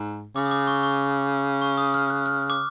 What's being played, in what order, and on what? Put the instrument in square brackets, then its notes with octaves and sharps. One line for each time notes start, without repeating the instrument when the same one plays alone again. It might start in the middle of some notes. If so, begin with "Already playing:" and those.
Already playing: [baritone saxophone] G#2
[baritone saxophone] C#3 [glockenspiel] D6
[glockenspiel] D#6
D6
C#6
C#6
C#6
D#6
F6
F#6
F6
D6